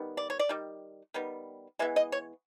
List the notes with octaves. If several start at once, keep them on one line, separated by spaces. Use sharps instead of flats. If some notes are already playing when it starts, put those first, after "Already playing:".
Already playing: D#3 G3 B3
D5
C#5
D5
D#3 G3
D#3 G3 B3
E3 G#3 B3 E5
D#5
C#5